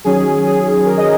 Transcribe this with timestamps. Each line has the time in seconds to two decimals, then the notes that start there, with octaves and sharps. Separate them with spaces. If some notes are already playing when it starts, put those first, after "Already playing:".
0.04 D#3 F#3 C#4 G#4
0.46 G#4
0.86 A#4
0.97 D#5